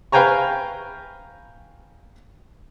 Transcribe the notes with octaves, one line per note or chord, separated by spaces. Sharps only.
B4 F5 G5 G#5 A#5 C#6